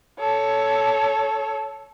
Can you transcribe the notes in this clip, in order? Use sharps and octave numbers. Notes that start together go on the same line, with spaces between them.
A4 C#5